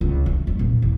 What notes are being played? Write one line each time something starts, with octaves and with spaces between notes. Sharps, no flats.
C#2
D#3
F2
A#1
E2